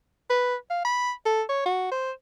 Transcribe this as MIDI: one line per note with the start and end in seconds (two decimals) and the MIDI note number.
0.30 0.56 71
0.70 0.84 77
0.85 1.12 83
1.26 1.43 69
1.49 1.64 73
1.66 1.89 66
1.92 2.12 72